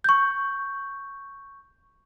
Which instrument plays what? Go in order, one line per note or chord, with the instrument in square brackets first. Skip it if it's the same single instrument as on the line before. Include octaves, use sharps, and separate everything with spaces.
[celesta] C#6 G6